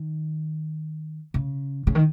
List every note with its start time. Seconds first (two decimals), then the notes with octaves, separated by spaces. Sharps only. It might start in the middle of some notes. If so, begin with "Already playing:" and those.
Already playing: D#3
1.34 C#3
1.87 C#3
1.95 D#3